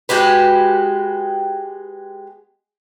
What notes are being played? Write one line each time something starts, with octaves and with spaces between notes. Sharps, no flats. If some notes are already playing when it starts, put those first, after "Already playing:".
G#3 F#4 G4 B4